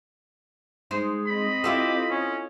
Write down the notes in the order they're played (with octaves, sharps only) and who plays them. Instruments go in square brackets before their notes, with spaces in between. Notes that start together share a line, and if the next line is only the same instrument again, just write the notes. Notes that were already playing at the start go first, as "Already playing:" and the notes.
[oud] G#3 D#4 C5
[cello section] C4 D#5 [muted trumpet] B5
[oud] E4 F4 A4 [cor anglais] G4
[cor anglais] C#4